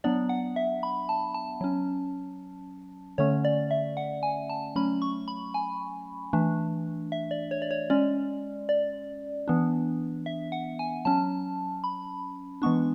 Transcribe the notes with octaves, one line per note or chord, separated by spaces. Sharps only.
F#3 B3 D4 D5
F#5
E5
B5
A5
A5
F#3 C#4
D3 A3 C#4 C#5
D5
E5
F#5
G#5
A5
F#3 A3 C#4 B5
C#6
B5
G#5
E3 A3 D4
E5
D5
C#5
D5
C#5
G#3 C#4 D5
D5
E3 B3 D4
E5
F#5
G#5
F#3 C#4 A5
B5
E3 G#3 B3 D4 C#6